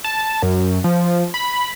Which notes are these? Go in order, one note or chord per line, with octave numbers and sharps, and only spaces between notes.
A5
F#2
F3
B5